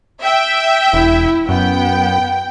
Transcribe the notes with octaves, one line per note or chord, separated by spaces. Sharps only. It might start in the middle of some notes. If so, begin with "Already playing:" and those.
E5 G5
E1 E4
F#2 B3 G5